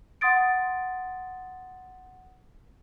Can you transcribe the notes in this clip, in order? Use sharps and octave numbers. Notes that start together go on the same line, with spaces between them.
F#5 C6 D#6 A6 D7